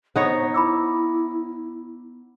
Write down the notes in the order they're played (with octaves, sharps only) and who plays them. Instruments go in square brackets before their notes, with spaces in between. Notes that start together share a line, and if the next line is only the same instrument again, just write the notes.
[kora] B3 D#4 C#5 [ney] C5
[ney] E4 [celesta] B5 D6 E6